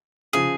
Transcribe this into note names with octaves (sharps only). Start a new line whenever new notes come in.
C#3 F3 G#4